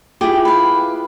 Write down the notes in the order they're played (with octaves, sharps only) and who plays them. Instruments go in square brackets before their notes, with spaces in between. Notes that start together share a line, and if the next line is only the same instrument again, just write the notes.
[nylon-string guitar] E4 F4 G#4 [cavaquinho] G4
[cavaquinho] B4 F5